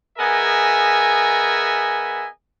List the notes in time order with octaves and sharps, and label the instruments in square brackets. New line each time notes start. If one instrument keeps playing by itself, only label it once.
[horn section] B3 G#4 A#4 D#5 E5 G#5